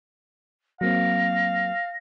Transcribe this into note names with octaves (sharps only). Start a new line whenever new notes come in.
F#3 A#3 C4 F5 A#6